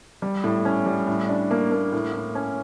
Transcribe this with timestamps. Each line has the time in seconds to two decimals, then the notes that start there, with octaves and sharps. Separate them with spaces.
0.22 G3
0.44 A2
0.65 C#4
0.86 G3
1.08 A2
1.28 D4
1.51 A#3
1.72 A#3
1.92 A2
2.13 A2
2.35 C#4